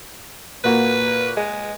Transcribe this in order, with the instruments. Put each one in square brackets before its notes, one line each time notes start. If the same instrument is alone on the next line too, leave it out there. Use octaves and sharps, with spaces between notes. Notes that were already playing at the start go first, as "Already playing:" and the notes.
[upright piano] A#2 A#3 F#4 [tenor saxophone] B4
[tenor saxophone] G#3